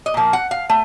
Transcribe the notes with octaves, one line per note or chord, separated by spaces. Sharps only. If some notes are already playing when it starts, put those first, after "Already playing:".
D#5
A#2 F3 A#3
F#5
F5
A3